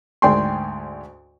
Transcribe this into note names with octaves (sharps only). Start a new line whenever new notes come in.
D2 G#2 D5 G5 G#5 C6